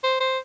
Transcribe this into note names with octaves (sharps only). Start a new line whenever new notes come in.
C5
C5